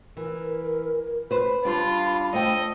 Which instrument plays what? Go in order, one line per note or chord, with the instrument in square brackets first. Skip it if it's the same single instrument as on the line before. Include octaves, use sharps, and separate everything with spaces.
[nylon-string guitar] E3 [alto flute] A#4
[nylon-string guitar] B4 C5 [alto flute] B5
[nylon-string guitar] G3 D4 [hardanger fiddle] F4
[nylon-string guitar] A3 G5 [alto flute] C5 [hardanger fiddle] D#5